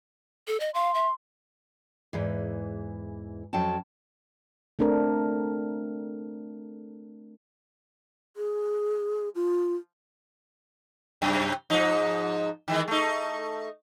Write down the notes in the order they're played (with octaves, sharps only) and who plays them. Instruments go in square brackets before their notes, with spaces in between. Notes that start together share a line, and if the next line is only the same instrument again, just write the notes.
[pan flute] A4
D#5
[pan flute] F5 [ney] C6
[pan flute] E5
[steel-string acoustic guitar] E2 G#2 E3
F2 F#3 C#4 G5 A5
[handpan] A3 C4 D4 A4 A#4
[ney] G#4
F4
[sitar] F#2 C3
G#2 F3 D#4
D#3 E3 G#3
A3 D#4